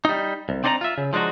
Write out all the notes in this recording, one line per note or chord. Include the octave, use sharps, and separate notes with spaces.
G3 D#4
C2
C4 D4 D#4 D5 F#5 A#5
F4 E5
C#3
F3 G#3 D4 D#4 F#4